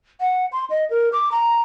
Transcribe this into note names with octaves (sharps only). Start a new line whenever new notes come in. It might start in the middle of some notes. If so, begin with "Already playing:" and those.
F#5
C6
D#5
A#4
D6
A#5